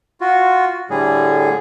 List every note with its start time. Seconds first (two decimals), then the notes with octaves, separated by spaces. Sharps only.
0.21 F4 F#4
0.90 A2 D3 G3 G#4